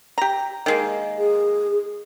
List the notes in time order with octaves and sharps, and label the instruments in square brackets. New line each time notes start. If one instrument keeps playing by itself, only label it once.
[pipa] G4 A#5
D#3 G#3 A#3
[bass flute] G#4